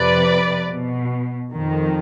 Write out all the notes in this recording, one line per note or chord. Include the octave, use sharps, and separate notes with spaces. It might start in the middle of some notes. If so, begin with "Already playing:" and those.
Already playing: F2 C3 F3 B4 D5
B2
F2 D#3